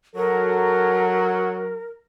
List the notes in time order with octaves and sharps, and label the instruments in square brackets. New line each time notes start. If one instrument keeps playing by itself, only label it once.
[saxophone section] F#3 [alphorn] A4 [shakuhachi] A#4